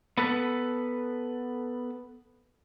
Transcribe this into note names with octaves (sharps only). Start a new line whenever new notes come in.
B3 A4 B4